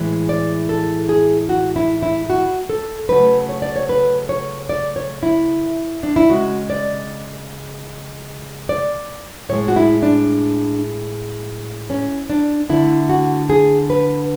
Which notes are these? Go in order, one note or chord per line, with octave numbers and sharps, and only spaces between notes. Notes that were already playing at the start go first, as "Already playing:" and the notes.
Already playing: A2 E3 G#3
D5
A4
G#4
F#4
E4
E4
F#4
A4
C#3 F#3 A3 B4
C#5
D5
C#5
B4
C#5
D5
C#5
E4
D4
E4
C#3 G#3 F#4
D5
D5
A2 G#3 C#5
F#4
E4
D4
C#4
D4
D3 A3 E4
F#4
G#4
B4